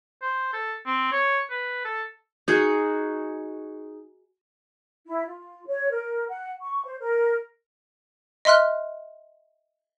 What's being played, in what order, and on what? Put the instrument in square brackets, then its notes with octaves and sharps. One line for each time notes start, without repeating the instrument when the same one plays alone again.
[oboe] C5
A4
C4
C#5
B4
A4
[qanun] D#4 F#4 G#4
[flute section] E4
F4
C#5
A#4
F#5
C#6
C5
A#4
[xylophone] D#5 E5 C6 F6 F#6